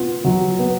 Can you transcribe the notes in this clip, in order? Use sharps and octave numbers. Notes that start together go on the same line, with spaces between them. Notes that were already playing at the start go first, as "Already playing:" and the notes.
Already playing: B3 F4
F#3
B3